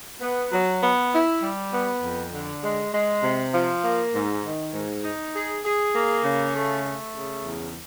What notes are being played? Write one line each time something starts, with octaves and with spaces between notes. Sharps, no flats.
B3
F#3
B3
E4
G3
B3
F2
D3
G#3
G#3
C3
F3
A#3
G#2
D#3
G#2
D#4
G#4
G#4
A#3
C#3
A3
A3
C#3
E2